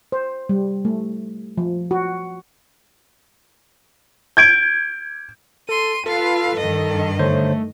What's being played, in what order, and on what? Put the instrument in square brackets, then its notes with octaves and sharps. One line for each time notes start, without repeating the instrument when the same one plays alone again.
[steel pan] C5
G3
A3
F3
F#4
[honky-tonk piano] G6 G#6 D7
[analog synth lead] A4 [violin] C6 D#7
[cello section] F4 B4 [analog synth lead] A4 [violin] F5
[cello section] G2 D#3 [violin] D#5
[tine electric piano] D3 C5 C#5 [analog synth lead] A3